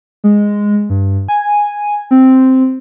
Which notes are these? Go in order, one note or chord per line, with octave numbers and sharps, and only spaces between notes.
G#3
G2
G#5
C4